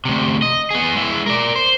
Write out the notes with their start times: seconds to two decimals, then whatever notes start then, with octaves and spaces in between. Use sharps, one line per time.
0.05 D2 C3
0.42 D#5
0.71 B3 G#4
0.95 G#3 E4
1.26 A#4 D5
1.56 C5